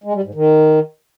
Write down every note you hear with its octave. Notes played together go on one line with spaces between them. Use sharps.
G#3
G3
G#2
D#3